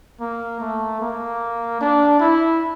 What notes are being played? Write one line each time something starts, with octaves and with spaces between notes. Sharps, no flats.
A#3
A3
A#3
D4
E4